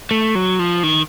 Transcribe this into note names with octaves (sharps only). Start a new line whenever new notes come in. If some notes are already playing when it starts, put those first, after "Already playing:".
A3
F#3
F3
D#3